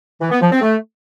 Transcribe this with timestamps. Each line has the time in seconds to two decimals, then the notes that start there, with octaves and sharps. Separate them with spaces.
0.21 E3
0.31 B3
0.41 F3
0.51 C4
0.61 A3